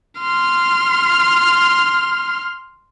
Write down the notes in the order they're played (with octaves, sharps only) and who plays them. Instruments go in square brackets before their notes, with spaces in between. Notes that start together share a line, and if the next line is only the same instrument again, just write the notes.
[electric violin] C6 F6